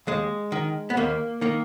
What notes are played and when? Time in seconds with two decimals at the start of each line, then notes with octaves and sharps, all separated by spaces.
0.07 D#2 G#3
0.52 D#3
0.90 B3
0.97 D#2 A#3
1.41 D#3 A#3